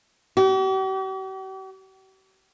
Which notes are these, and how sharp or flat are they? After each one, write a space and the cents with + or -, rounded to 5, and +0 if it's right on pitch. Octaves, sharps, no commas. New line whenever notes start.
G4 -45